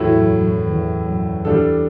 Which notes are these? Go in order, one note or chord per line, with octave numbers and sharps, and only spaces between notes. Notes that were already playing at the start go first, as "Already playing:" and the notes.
Already playing: E2 A2 F#3 A3 E4
F#2
F#2
E2
F#2
E2 G3 D4 A4